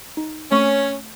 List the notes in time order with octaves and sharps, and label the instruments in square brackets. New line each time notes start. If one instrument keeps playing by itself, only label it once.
[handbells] D#4
[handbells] A3 C4 C#6 [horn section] C#4